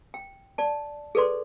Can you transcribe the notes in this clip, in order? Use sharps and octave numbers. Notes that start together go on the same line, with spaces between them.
G5
D5 A5
G#4 A4 B4 D5 C6